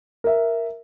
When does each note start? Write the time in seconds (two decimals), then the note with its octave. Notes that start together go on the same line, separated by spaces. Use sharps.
0.24 A#4 E5